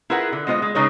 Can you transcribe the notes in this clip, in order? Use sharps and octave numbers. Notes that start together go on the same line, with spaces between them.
E4 F4 G#4 A#4 B4 F#5
D3
G#3 B3 F4 C5 D#5
G#3
C#3 G#3 D#4 B4 C#5